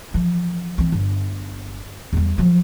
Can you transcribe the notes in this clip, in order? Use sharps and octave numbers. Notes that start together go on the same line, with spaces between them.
E3 F3
E3 C4
G1
E2 G3
F3 F#3